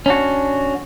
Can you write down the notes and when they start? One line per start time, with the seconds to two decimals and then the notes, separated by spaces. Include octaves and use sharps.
0.06 C#4 D4 F#4